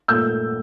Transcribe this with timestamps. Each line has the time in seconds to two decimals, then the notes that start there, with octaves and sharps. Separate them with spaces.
0.08 A#2 A3 E6 G6